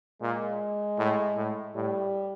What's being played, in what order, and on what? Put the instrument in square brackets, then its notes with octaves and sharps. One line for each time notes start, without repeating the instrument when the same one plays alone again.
[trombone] A#2 [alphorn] G#3
[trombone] A2
A2
[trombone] A2 [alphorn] G3